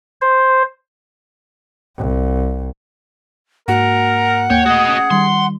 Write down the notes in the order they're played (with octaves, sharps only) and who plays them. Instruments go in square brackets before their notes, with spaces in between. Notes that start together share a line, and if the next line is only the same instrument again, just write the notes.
[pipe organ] C5
[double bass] C2
[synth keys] G#2 A#3 F#4 [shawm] A#4 [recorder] F#5
[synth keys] D#2 A#3 [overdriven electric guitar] C#5 [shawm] G5
[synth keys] A3 [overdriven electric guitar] F#4 D#5 [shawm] G#4
[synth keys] C#4
[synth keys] D#3 G3 [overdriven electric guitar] C6